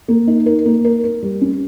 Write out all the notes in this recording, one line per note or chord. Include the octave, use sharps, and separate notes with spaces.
A#3
D#4
A#4
A#3
A#4
A#4
G3
C#4